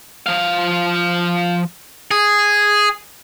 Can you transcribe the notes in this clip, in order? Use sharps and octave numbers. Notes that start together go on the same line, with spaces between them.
F3 F5
G#4